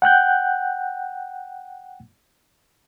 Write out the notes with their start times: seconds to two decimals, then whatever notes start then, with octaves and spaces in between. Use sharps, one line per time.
0.02 F#5 G5 F#6 G6